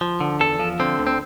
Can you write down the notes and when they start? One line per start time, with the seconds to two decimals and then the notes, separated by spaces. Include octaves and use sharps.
0.01 F3
0.21 D3
0.40 E2 A4
0.59 F3
0.80 D3 C4
0.99 D2
1.07 C4